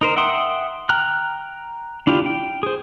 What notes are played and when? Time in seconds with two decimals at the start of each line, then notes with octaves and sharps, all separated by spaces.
0.01 D#4 A#4 C5
0.16 E5 F#5 G5 C6 D#6
0.89 G5 A#5 F6 F#6
2.07 D4 E4 F4 G4
2.26 G5
2.63 G#4 C5